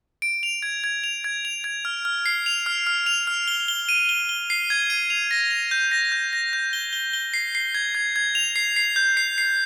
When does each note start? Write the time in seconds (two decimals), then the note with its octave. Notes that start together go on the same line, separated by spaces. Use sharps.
0.22 D7
0.43 F7
0.63 G#6
0.84 G#6
1.04 F7
1.24 G#6
1.45 F7
1.64 G#6
1.85 F6
2.05 F6
2.26 C7
2.46 F7
2.66 F6
2.87 F6
3.06 F7
3.27 F6
3.48 G7
3.68 G7
3.89 D#7
4.09 G7
4.29 G7
4.50 C7
4.70 G#6
4.90 D#7
5.10 F7
5.31 A#6
5.51 F7
5.71 G6
5.91 A#6
6.12 G6
6.33 A#6
6.53 G6
6.73 G7
6.93 G7
7.13 G7
7.34 C7
7.55 C7
7.75 G#6
7.95 G#6
8.16 G#6
8.35 F7
8.56 C7
8.76 C7
8.96 G6
9.17 C7
9.38 C7